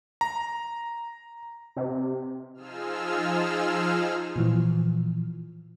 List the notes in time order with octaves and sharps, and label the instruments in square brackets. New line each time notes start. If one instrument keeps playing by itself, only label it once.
[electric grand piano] A#5
[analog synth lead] C3
[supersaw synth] F3 D#4 F4 G#4 E6 F6
[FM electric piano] A#2 E3 F3